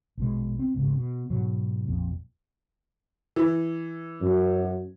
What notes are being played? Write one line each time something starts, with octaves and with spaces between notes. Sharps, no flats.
A#1 B2 G#3
C4
F#1 C#2 G#2 C#3
B2
G#2 B2 F#3
A#1 F2 A#2
E3
F#2